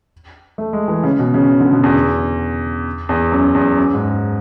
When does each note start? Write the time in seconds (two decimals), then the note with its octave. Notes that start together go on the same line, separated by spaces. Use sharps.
0.58 A3
0.73 G#3
0.88 E3
1.03 C#3
1.19 B2
1.34 C#3
1.60 D3
1.72 B2
1.83 E2
3.09 E2
3.32 F#2
3.55 E2
3.77 F#2
3.93 G#2